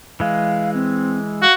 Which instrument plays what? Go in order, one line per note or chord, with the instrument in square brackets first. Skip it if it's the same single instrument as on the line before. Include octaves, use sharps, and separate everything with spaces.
[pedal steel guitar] E3 G#3 [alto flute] F5
[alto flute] C4
[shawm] F#4 [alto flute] F5